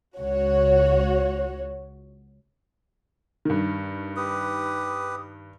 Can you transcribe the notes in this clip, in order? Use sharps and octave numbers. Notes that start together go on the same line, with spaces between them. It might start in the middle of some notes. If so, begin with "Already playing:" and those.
C#2 F#4 C#5
G2 D#3
G4 B4 D#6